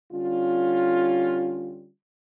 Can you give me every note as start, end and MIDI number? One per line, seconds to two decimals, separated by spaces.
0.12 1.87 50
0.12 1.87 55
0.12 1.87 61
0.12 1.87 65